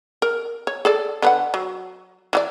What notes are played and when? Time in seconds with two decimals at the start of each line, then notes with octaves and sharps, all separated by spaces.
0.22 A#4
0.67 C#5
0.85 G#4 A4 D5
1.22 D3 B4 F#5
1.54 F#3
2.33 E3 F#4 D5